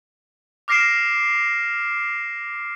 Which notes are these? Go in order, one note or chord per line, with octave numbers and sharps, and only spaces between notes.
D6 F6 A#6 C7 D7 E7